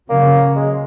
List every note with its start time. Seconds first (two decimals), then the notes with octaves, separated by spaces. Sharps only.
0.09 C#3 F#3 A#3 C#4
0.56 G#3